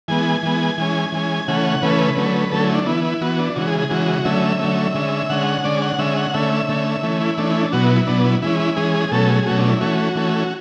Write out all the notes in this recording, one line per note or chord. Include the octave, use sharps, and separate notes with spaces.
E3 G#3 B3 G#5
E3 G#3 B3
E3 G#3 C#4
E3 G#3 C#4
C#3 E3 A3 C#4 F#5
C#3 E3 A3 C#4 B4
D3 F#3 A3 C#4
D3 F#3 A3 C#4 A4
E4
D4
E3 B3 E4
E4
E3 B3 F#4
D4
C#3 E3 G#3 F#4
G#4
G#4
C#3 E3 G#3 F#4
D3 F#3 A3 C#4 E5
D3 F#3 A3 C#4
D3 G#3 C#4
D3 G#3 C#4 F#5
D3 G#3 C#4 D5
F#5
D3 G#3 C#4 E5
F#5
D3 A3 C#4 E5
D3 A3 C#4
E3 A3 C#4
E4
E3 A3 C#4 D4
E4
D4
B2 F#3 B3 F#4
E4
E4
B2 F#3 B3 D4
E4
E3 G#3 C#4 E4
E4
E3 G#3 C#4 G#4
G#4
B2 F#3 A3 C#4 A4
G#4
B2 F#3 A3 C#4 F#4
D4
E4
E3 A3 C#4 F#4
E3 A3 C#4